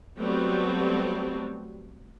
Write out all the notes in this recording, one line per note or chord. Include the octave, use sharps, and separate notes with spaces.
F#3 G3 A3 B3 C4